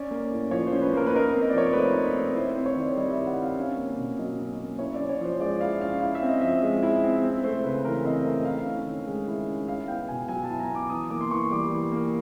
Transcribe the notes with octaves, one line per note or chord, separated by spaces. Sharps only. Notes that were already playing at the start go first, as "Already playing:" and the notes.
Already playing: C#4 D5
A#3
A2
F3 C#5
C5
C#4
B4
A#3 A#4
B4
D#4 A#4
C4
D#5
D5
F3 C#5
C5
A3 B4
D#4
C4
E4 C5
C5
C4
C#5
D#3 D5
G3 D#5
E5
E4
F#5
C4
F5
C#4
A#3
B2
F#3 D#5
C#4
A#3
E4 C#5
C#4 D5
C#5
F3 C5
G#3 D5
E4 F5
C#4 F5
E4 F5
E5
C4
D#5
F3 E5
G#3
E4
C4
C4
A3 C5
C#3 B4
E3 A#4
C4 D#5
A3 E5
E4 F5
C#4
D#3
G#3
E4
C#4
E4 F5
B3 G5
B2 G#5
F#3 G#5
A5
E4
A#5
B3 D6
E3 D#6
A#3 D6
C6
E3 C#6
G3 D6
E3
A#3